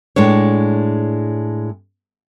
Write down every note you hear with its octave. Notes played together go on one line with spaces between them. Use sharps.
A2 G#3 D4 C#5